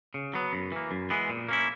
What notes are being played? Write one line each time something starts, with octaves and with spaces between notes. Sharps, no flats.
C#3
F#3 B3
F#2
E3 A#3
F#2
E3 G#3 B3
A#2
A#3 C#4 E4